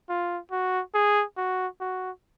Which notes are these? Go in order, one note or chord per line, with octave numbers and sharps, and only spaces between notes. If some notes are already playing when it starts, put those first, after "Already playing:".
F4
F#4
G#4
F#4
F#4